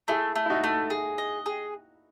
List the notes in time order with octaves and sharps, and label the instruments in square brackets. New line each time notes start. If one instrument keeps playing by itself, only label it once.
[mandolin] A3 [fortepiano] E4 G#4
[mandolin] A3
[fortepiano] E4
D#4 F#4
[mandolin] A3
G#4
D#5
G#4